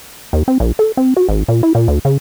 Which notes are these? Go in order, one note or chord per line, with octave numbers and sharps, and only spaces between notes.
D#2
C4
A#1
A4
C4
F#4
G#1
A#2
E4
A#2
D2
C#3